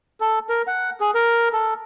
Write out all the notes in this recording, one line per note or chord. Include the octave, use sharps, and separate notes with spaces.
A4
A#4
F#5
G#4
A#4
A4